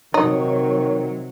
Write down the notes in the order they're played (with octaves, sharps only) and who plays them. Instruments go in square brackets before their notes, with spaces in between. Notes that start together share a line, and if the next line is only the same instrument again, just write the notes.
[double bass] C3 F#3 [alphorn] D#3 [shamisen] D#4 [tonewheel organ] C#5